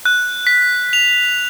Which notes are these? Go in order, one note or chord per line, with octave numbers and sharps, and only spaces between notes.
F#6
B6
F7